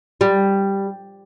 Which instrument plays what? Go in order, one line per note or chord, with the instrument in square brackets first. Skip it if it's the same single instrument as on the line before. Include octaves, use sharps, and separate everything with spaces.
[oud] G3